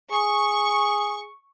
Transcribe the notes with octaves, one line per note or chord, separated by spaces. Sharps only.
G#4 C#6